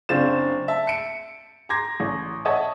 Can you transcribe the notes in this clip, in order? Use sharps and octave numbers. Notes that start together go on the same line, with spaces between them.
F#1 C4 D4 F4 A6 E7
E5 A5
C#7 D7
A#5 C6 D6 G#6 A#6
A1
C#5 D#5 E5 F#5 A5 D#6